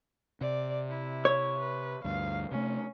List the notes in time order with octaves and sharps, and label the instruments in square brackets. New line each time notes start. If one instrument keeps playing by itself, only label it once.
[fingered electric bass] C3 [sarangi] D5
[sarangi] E4
[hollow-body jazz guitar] C#5
[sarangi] B4
[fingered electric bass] D2 G2 [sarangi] F5
[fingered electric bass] C3 A3 [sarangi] C#4